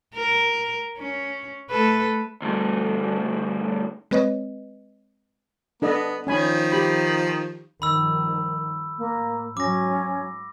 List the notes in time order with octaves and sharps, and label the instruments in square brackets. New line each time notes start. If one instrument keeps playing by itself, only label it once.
[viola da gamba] A#4
C#4
A3 A4 B4
[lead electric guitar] D2 G2
[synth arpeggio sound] G#3 C4 B4 C#5 D#5
[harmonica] B3 [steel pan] D4 A4 D#5
[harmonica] D#3 F3 [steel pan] C#4 G#5 B5
[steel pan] G4 B5
[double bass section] G2 D#3 F3 [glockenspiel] B5 E6
[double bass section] A2 [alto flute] A#3
[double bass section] G#2 F#3 [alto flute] C#4 [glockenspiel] D6 A#6